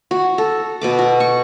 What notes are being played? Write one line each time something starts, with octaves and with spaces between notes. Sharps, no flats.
F#4
A4
B2 B4 D6
F#4
C#6